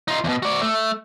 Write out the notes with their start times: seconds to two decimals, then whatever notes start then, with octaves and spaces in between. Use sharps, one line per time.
0.08 D#4 F4
0.24 E2 B2
0.42 F#4 D5
0.62 A3